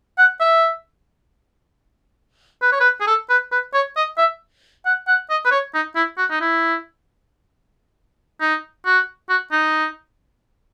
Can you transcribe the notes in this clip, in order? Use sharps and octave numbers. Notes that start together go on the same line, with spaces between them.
F#5
E5
B4
C#5
B4
G#4
A4
B4
B4
C#5
D#5
E5
F#5
F#5
D#5
B4
C#5
D#4
E4
F#4
D#4
E4
D#4
F#4
F#4
D#4